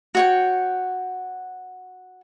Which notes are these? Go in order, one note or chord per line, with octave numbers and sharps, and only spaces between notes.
F#4 C#5 G5